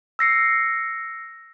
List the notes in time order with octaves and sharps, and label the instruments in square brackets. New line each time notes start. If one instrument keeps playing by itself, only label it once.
[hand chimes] E6 A#6 C7 C#7